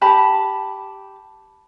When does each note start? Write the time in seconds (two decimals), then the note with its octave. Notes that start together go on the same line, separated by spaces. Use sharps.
0.01 G4 A5 B5